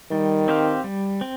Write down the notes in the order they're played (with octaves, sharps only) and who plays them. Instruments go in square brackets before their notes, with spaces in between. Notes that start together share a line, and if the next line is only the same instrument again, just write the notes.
[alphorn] D#3 [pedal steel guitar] G3
[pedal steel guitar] C4 G4 C5 F5
G3
C4